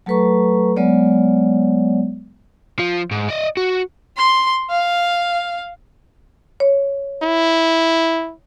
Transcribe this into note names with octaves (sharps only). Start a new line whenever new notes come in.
F#3 A3 A4 B4 A#5 C#6
F#3 G#3 B3 C#5 D5
F3
G#2
D5 D#5
F#4
C6
F5
C#5
E4